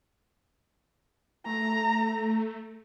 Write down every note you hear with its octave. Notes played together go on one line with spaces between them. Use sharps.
A3 A#5